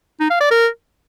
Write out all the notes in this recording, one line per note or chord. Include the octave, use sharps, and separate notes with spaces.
D#4
F5
D5
A#4